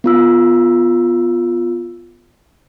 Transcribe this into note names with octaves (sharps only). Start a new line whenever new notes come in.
B3 F4 E6